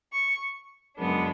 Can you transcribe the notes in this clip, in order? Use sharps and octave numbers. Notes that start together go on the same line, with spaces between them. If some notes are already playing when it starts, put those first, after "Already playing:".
C#6
F#2 C#3 G#3 B3 D4